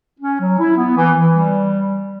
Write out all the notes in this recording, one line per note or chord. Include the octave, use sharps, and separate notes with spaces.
C#4
F#3
E4
B3
E3
E3
G3